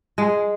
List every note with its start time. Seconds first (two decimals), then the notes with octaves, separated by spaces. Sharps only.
0.18 G#3